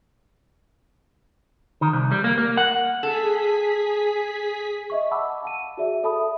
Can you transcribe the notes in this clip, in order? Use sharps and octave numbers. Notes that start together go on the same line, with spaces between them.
D#3
C2
G3
A#3
A#3
F#5
G#4 A4 B6
D#5 E5 C#6
F#5 A5 B5 D6 E6
F5 A5 D#7
F#4 G#4 D5 E5
A4 E5 A5 B5 D#6